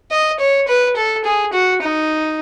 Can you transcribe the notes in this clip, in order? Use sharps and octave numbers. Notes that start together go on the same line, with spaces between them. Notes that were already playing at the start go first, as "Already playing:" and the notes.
D#5
C#5
B4
A4
G#4
F#4
D#4